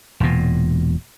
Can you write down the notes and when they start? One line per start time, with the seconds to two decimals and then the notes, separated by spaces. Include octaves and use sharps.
0.20 E1 A#2